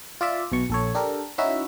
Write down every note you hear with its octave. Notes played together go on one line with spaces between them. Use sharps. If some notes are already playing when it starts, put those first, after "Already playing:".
F4 D5 E5
B1 B2 C#6
A#1 A4 C#5
D4 G4 A4 A#4
C#4 D#4 E4 F#4 E5